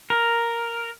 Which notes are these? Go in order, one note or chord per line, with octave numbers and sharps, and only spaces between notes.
A#4